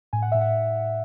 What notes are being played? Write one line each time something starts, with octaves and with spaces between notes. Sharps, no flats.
A2 G#5
F#5
A2 E5
F#5